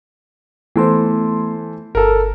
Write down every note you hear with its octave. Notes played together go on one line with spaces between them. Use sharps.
E3 A3 B3 A4 C5 C6
G1 A4 A#4